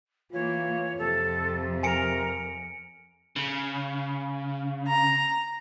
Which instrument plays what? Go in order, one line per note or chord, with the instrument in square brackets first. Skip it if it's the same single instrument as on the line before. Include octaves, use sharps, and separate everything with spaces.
[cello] E3 A#3 [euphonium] F4 [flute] C#5
[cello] F2 [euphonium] C3 [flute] A4
[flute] A#4 [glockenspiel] G#5 C#7 D7
[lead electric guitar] C#3
[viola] A#5